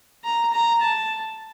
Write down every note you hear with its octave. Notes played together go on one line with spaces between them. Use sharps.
A#5
A#5
A5